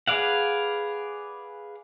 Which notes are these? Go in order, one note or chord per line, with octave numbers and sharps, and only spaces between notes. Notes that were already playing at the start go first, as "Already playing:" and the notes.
G#4 B4 D5 F5 F#5